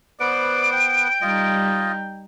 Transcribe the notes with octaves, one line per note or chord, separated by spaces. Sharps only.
B3 B4 C5 D5 F#5 D7
G5
G3 D#4 F4 D#5